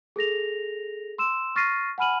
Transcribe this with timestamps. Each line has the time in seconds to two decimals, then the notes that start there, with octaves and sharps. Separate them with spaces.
0.16 G#4 A4 A#6 F7
1.18 C6 E6 E7
1.56 C#6 F6 A6 A#6 C7 D#7
1.98 F#5 G#5 B5 F6 D#7 F#7